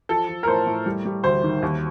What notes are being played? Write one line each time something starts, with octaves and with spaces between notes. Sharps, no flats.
F3 A4
F3
A#4
A2 C5
A2
G3
G3
D2 C5
D#3
D#2